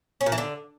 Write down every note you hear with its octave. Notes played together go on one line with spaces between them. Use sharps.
C#4
A#2
E3
D3